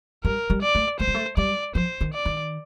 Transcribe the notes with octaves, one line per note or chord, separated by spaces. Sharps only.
G3 A#4
G3
D5
A3
A3 C5
G3
A3
G3 D5
F3 C5
D#3
D5
D#3